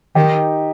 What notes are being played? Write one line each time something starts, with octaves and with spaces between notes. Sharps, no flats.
D#3 D#4 G4